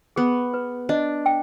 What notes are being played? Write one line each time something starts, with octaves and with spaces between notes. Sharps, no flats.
B3 G#4
B4
D4 D#5
G5